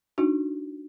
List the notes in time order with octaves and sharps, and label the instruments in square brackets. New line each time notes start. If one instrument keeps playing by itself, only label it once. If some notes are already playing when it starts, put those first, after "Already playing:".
[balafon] D4 D#4 F#4